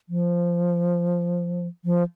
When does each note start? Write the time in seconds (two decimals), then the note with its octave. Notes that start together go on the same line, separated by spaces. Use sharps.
0.09 F3
1.85 F3